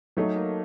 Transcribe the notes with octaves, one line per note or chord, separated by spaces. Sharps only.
F#3 A3 D#4
A#3